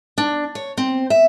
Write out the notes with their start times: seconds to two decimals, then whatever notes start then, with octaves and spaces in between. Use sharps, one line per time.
0.18 D4
0.55 C#5
0.77 C4
1.10 E5